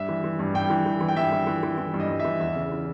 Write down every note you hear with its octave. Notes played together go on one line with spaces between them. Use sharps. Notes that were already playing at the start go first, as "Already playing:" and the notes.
Already playing: G2 E5
E3
E3
G2
G2 G5
E3
E3
E3
G5
G2 E5
E3
E3
E3
E3
G2
D#5
G2
E3 E5
E2 E5
C#3
E3